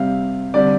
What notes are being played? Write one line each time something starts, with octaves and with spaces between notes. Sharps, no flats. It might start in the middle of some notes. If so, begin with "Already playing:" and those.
Already playing: C3 G3 C4 F5
D3 G3 C4 D5